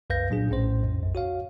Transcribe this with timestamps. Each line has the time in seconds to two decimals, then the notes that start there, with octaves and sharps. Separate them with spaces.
0.10 C2 F#2 B4 F5 G6 A#6
0.30 A#2 F#3 D4 G#4
0.50 A#1 A2 C#4 C5
0.83 F2
1.03 B1 F#2
1.15 F#4 C#5 F5